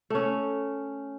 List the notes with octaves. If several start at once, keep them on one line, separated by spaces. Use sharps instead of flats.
A3 C#4